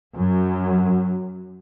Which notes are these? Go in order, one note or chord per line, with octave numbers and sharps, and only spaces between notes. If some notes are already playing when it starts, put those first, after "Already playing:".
F#2 F#3